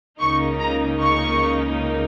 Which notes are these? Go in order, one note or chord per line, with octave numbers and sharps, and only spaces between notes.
C#2 C#3 A#3 D#4 C#6
A#5
C#6